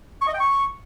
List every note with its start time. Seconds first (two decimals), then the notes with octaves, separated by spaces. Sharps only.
0.21 C#6
0.27 D#5
0.34 G5
0.40 C#6